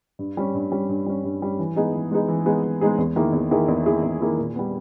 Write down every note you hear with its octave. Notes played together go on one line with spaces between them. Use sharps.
G2
G3 C#4
G2
G3 C#4
G2
G3 C#4
G2
G3 C#4
E3
G#3 B3 D#4 G#4
E3
G#3 B3 D#4 G#4
E3
G#3 B3 D#4 G#4
E3
G#3 B3 D#4 G#4
E2
D#3 A#3 E4 G#4
E2
D#3 A#3 E4 G#4
E2
D#3 A#3 E4 G#4
E2
D#3 A#3 E4 G#4
A#2
G3 B3